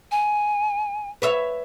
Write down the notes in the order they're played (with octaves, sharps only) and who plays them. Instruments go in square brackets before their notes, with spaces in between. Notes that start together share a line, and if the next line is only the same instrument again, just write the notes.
[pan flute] G#5
[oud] B4 C#5 E5